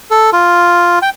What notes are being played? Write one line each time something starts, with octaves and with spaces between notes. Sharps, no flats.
A4
F4
G5